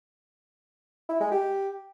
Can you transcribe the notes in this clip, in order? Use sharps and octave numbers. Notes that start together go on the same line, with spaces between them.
E4
G#3
G4